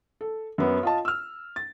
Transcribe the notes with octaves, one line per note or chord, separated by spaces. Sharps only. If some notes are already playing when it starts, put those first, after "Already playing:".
A4
F#2 B3
F4 D#5 A5
E6 F6
A6